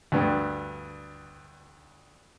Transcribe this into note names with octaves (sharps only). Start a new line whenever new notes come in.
D2 G2